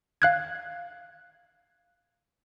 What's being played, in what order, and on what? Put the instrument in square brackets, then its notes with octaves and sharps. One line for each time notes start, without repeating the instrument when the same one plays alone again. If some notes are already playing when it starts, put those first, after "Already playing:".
[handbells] F5 F#6 G#6